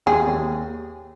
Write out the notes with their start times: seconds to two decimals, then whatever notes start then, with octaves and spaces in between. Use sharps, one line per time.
0.06 D#2 G#4
0.27 D#2